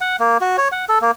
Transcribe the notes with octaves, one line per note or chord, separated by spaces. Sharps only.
F#5
A#3
F#4
C#5
F#5
A4
A#3